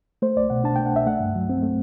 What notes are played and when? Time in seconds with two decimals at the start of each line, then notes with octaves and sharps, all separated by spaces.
0.22 A3 C5
0.36 C2 D5
0.50 B2 F#5
0.64 D4 A5
0.76 G5
0.79 A3
0.86 F#5
0.92 C2 E5
1.06 A3 F#5
1.20 G2
1.35 F#3
1.50 C4
1.63 A3